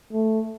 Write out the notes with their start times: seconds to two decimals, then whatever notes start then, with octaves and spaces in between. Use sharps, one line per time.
0.13 A3